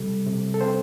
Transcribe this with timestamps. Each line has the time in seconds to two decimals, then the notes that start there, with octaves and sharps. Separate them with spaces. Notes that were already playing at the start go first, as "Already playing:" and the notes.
Already playing: C3 G3 C4 A4
0.26 C3
0.54 A4
0.61 C4 C5